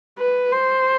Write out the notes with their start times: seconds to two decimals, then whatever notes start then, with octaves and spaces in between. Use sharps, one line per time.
0.19 B4
0.52 C5